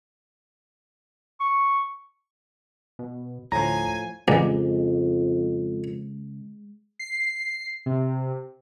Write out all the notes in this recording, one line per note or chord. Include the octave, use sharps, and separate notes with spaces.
C#6
B2
D2 A2 F3 G#5 A#5
A1 F2 C#3 G#3 D5
C7
C3